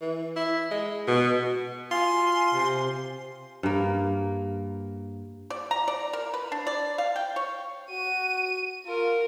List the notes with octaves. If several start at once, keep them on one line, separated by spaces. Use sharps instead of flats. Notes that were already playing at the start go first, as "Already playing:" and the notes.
E3
E4
G#3
B2
F4 G#5 C6
C3
G2 A#3
D5
A#5
D5
A#4
B4
D4
D5
F5
G5
C#5
F#4 D#7
F4 A#4